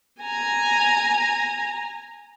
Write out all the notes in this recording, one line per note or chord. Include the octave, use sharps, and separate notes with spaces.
G#5 A#5